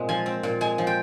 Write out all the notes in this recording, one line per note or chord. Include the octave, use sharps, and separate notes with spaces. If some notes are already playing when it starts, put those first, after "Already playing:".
Already playing: A#2 G#3 C4
F3 G#5
C4
A#2
G#3 G#5
F3
G5